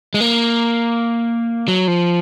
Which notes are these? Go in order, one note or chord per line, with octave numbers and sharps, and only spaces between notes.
G#3
A#3
F#3
F3